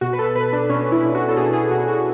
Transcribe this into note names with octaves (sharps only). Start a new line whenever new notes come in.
B2 F#4
B4
A4
B2 B4
D4
B2 C#4
E4
B2
F#4
A4
B2 G#4
G#4
B2 F#4
F#4